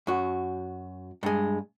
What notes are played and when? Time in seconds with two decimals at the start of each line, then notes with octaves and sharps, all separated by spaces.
0.07 F#2 F#4
1.23 G2 G#3